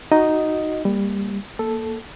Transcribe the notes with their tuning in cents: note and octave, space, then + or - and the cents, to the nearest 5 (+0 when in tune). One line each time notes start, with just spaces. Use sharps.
D#4 +0 F#4 +0 D#5 +0
G3 +20 A#3 +0
A#3 +0 A4 +0